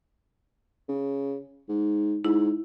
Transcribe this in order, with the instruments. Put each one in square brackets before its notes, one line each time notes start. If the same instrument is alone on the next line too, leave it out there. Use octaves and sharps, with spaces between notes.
[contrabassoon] C#3
G#2
[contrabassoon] G#2 [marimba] E4